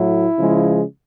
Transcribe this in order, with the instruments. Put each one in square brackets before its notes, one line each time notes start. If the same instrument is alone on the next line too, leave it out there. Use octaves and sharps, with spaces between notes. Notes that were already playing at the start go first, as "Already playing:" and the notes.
Already playing: [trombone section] A2 F#3 A3 E4
C#3 F3 G#3